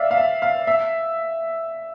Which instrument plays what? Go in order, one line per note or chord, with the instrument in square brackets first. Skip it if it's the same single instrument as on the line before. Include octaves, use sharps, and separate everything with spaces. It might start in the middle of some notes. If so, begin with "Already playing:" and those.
Already playing: [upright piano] D5 E5 F5
F5
E5
F5
E5